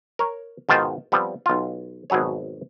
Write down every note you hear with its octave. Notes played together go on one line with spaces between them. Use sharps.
A#4 C#5
G#2 B2 D#3 F4 G5 A5
F3 G3 B3 C4
B1 F4
G#1 B2 F#3 G#4 C#5